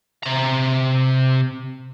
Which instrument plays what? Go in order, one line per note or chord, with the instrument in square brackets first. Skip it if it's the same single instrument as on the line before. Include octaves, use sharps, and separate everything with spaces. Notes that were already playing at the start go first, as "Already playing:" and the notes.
[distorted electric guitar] C3 A#5